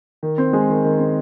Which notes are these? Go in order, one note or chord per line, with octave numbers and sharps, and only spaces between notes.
D#3
C4
G#3
D#3
D#3
C4